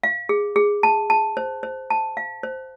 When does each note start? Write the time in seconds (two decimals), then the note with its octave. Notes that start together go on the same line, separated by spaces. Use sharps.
0.03 F5
0.29 G#4
0.56 G#4
0.83 A5
1.10 A5
1.37 C5
1.63 C5
1.90 A5
2.17 F5
2.43 C5